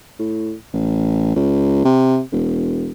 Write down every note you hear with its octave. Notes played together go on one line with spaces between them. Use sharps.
A2
A1
C#2
C3
E1